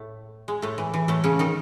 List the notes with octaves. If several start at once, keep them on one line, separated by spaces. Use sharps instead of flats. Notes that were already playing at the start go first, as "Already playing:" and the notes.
Already playing: A2 A3
G#3
A2 A3
E3
E3
A2 A3
C#3 C#4
D#3 D#4